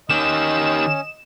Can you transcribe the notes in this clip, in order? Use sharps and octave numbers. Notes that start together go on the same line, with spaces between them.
D#3 C#4 G4 D#5 E7